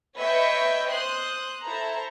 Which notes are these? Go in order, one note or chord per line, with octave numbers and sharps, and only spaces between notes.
B4 C#5 D#5 E5 G5 C#6
C5 C6 D#6 F#6
E4 A4 C5 A#5